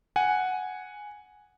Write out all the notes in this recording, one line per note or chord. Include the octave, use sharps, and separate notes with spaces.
F#5 G#5